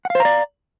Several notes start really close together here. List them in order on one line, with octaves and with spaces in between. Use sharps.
F#5 F5 C5 A#5 D5